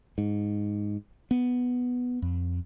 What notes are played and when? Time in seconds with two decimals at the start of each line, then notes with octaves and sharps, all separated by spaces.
0.18 G#2
1.31 B3
2.22 F2